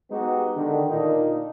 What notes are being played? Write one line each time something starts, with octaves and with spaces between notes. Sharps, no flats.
G#3 B3 D#4 F#4 G4
D3 D#3
A#2 A#3 D4 D#4